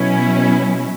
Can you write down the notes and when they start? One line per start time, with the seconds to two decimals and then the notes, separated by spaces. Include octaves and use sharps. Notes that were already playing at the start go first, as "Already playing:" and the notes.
Already playing: B2 F#3 C#4 E4